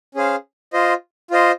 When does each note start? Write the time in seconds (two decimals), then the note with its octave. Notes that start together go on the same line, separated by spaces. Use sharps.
0.15 C#4 G#4 C5 F5
0.73 F4 C5 D#5
1.31 F4 C5 D#5